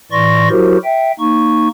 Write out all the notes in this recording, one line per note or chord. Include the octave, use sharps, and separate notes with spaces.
A2 E3 D5 C6 C#6 A#6
F#3 E4 F#4 G4 A#4 C5
E5 G5
A#3 D#4 C#6